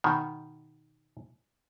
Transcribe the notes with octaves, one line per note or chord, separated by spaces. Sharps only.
B2 D#3